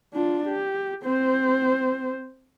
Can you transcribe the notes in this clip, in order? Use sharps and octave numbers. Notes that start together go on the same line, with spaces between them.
D4 F4
G4
C4 C5